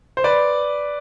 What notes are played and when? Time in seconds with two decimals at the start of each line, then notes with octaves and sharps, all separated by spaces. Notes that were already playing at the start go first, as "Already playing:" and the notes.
0.17 C5
0.24 B4 D5